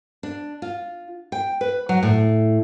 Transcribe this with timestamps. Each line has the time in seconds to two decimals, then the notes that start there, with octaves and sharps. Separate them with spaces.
0.23 D4
0.62 F4
1.32 G5
1.61 B4
1.89 F#3
2.03 A2